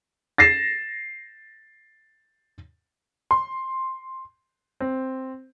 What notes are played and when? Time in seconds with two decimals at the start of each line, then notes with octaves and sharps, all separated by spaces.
0.38 A6 A#6 C7 E7
3.31 C6
4.80 C4